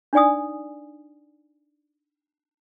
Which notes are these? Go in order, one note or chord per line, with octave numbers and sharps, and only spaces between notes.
D4 D#4 D5 G#5 D#6